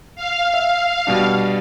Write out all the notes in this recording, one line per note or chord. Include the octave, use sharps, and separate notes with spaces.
F5
E5
B2 G3 D4